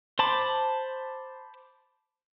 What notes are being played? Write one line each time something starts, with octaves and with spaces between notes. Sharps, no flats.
C5 A5 B5 D6